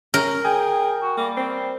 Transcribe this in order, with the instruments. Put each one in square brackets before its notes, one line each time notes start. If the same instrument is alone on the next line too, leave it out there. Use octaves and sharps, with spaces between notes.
[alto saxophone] C#4 [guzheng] A#4
[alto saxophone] G#4 [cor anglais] G5
[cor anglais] F#4
[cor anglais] G3 [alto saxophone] A#3
[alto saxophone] C4